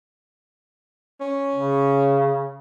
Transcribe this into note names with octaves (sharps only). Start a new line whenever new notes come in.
C#4
C#3